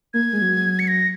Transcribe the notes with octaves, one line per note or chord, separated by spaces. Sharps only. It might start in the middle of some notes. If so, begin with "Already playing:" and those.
A#3 G#6
G#3
F#3
C#7
A#6